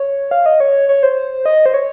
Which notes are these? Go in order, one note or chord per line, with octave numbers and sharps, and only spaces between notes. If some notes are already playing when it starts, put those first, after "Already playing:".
Already playing: C#5
F5
D#5
C#5
C#5
C5
D#5
C5
C#5